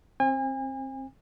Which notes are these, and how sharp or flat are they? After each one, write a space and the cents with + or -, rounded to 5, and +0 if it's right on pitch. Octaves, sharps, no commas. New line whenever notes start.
C4 +20 G#5 -40